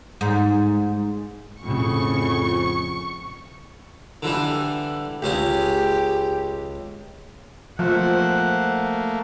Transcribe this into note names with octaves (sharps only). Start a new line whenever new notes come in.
G#2
F2 A2 C#3 C#6
D3 E3 G3
C#2 G#3 C#4 G4
F3 A3 A#3 C5 F#5